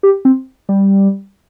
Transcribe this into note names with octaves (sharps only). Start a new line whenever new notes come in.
G4
C4
G3